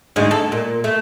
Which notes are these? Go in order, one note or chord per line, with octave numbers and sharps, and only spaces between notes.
D2 G#2 G#3
A4
A#2
A3